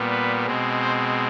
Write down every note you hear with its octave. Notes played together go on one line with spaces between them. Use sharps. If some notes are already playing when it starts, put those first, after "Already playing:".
Already playing: A#2 G3 B3
B4
B2 G#3 C4
C5